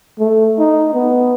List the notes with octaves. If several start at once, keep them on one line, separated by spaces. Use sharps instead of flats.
A3
D#4
B3